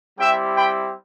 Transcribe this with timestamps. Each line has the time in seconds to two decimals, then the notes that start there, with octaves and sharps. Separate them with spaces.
0.18 G3 C4 E4 G4 E5 G5
0.56 G5 B5